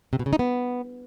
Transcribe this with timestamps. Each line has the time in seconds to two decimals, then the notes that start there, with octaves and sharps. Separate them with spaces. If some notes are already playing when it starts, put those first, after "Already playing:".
0.13 C3
0.19 B2
0.26 C#3
0.33 D#4
0.39 B3